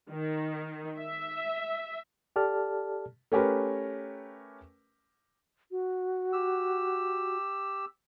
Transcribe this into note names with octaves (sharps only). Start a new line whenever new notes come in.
D#3
E5
G4 A4 D5 A5 F6
A3 C#4 G4 A#4 B4
F#4
G4 E6